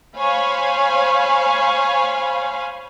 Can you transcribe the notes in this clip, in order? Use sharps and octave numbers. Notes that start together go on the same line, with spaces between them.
C5 C#5 F5 G#5 B5